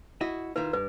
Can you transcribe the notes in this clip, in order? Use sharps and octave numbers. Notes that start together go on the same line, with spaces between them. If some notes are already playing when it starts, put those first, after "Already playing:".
E4 F#4 D#5
D#3 E4 F4 B4
G2 B4